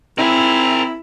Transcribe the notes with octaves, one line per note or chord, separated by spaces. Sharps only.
C4 E4 G#4 A#4